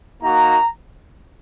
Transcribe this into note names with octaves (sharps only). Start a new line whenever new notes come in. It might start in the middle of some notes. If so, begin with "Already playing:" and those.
A#3 D#4 F#4 A#5